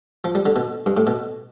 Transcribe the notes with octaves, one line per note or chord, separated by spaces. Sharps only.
F3
G3
D3
B2
G2
A2
B2